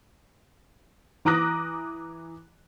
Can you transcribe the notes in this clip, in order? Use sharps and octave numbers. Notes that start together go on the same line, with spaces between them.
E3 A#5 D6 D#6 F#6 A#6